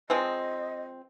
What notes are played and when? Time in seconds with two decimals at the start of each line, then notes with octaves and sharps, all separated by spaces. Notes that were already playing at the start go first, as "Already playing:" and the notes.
0.10 F3 G#3 C4 D#5